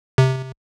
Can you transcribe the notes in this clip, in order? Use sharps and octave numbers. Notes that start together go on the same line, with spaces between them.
C3